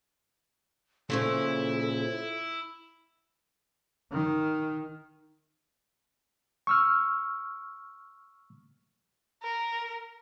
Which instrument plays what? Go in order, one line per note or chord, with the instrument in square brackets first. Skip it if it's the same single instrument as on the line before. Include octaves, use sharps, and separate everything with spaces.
[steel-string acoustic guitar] A#2 C#3 F3 [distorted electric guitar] E4 [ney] A4
[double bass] D#3
[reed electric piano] C#6 E6 F6
[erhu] A#4